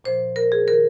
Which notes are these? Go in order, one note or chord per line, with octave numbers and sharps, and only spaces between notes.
A#2 F3 C5
A#4
G#4
D#3 A#4